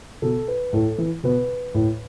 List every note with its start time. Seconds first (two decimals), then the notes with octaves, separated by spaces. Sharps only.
0.22 B2 A4
0.48 B4
0.73 A2 A4
0.98 E3
1.23 B2 B4
1.74 A2